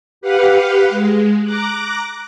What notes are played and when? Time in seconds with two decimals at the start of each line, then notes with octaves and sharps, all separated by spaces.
0.21 G4 B4 F5 F#5
0.89 G#3
1.42 A#5 D6 F#6